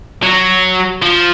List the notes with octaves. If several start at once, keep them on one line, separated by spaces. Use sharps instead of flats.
F#3
F3